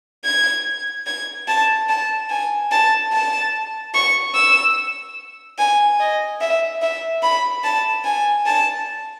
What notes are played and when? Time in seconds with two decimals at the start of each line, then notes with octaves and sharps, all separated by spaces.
0.25 G#6
1.06 G#6
1.48 A5
1.89 A5
2.30 G#5
2.71 A5
3.12 A5
3.94 C#6
4.35 E6
5.58 G#5
6.00 D#5
6.41 E5
6.82 E5
7.22 B5
7.64 A5
8.05 G#5
8.46 A5